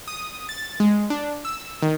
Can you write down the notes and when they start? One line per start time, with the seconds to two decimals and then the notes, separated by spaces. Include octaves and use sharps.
0.08 D#6
0.49 A6
0.80 G#3
1.10 D4
1.45 E6
1.82 D#3